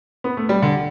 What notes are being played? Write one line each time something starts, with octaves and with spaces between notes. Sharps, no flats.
B3
A3
G3
D3